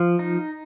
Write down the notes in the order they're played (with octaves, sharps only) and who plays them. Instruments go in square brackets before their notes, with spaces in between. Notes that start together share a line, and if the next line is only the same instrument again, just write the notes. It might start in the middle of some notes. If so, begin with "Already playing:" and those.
Already playing: [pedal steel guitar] F3
D#4